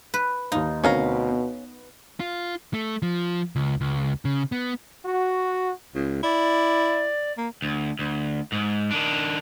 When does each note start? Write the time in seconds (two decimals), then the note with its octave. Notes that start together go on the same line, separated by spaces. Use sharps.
0.14 B4
0.52 D#2 D#4 F5
0.84 D2 B2 C4 C#4 A#4 F5 A#5
1.28 B3
2.20 F4
2.74 A3
3.02 F3
3.56 C#2
3.81 C#2
4.25 C#3
4.52 B3
5.06 F#4
5.95 C#2
6.23 E4 D5
7.37 A#3
7.62 D2
7.99 D2
8.52 G#2
8.91 D#3 D4